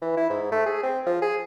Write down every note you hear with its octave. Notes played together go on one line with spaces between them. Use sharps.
E3
E4
G#2
A3
G#4
C4
F3
G#4